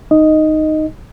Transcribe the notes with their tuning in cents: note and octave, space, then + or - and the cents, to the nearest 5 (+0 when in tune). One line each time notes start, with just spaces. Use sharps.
D#4 -5 D#5 +0